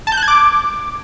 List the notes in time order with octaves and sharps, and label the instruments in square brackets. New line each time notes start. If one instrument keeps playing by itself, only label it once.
[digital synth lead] A5
G6
F#6
G#6
D6